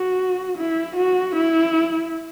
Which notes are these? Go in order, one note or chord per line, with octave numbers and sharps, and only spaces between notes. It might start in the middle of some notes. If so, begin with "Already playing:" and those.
Already playing: F#4
E4
F#4
E4